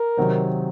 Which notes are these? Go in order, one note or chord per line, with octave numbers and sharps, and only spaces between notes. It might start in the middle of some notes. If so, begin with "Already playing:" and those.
Already playing: A#4
C3 D#3 F#3 C4 D#4